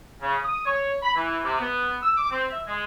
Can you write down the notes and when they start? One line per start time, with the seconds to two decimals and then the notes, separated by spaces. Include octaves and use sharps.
0.22 C#3
0.44 D#6
0.66 C#5
1.03 B5
1.16 E3
1.44 C3
1.59 B3
2.02 E6
2.17 D6
2.31 C4
2.49 E5
2.67 G#3